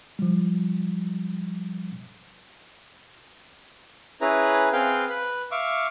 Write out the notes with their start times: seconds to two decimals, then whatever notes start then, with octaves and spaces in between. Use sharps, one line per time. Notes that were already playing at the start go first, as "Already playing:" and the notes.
0.19 F3 G3
4.21 C#4 E4 G#4 B4 A#5
4.73 C4 G#4 B4 F5 G5
5.10 B4 B5
5.51 E5 F5 C#6 D6